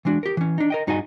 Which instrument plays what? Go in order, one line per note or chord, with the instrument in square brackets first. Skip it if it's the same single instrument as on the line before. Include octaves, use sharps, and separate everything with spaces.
[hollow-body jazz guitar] E3 G#3 D4 F#4
G4 A#4
E3 C#4
D4 D#4
A#4 D#5 G5
G2 D#4 F#4 G#4 D#5 G#5